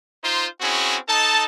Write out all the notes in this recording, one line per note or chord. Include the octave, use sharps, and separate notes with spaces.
D#4 F4 C5
C4 C#4 E4 F#4 G#4
D#4 A4 D#5 A5